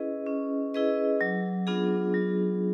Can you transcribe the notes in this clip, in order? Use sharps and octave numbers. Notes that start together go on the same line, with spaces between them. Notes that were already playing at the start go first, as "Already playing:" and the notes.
Already playing: C#4 E4 G#4 B4 D#5
C#4
E4 G#4 B4 D#5
F#3
B3 D4 F4 G#4
F#3